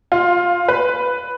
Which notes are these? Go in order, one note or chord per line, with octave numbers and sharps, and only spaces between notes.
F4
B4